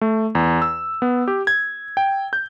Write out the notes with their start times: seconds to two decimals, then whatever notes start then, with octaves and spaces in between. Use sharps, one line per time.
0.01 A3
0.35 E2
0.62 E6
1.02 B3
1.28 G4
1.47 G#6
1.97 G5
2.33 G6